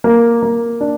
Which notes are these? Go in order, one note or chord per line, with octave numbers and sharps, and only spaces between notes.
A#3
A#3
D4